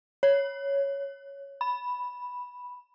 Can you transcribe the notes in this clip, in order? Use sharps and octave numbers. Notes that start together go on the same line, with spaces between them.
C#5
B5